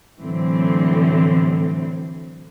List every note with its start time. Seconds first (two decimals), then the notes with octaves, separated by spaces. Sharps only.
0.21 A2 D3 E3 F#3 C4